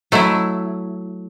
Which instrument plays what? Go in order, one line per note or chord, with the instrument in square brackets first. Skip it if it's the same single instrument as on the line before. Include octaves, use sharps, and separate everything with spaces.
[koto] F#3 A3 E4